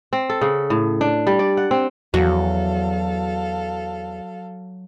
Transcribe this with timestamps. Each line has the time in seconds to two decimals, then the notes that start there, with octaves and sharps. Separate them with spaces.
0.13 C4
0.30 A4
0.41 C#3
0.70 A2
1.01 D4
1.27 G3
1.39 D5
1.57 F#5
1.71 C4
2.14 E2 F#3 F#4 A4 F5